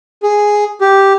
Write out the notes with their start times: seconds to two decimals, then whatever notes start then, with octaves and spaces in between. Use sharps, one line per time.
0.23 G#4
0.81 G4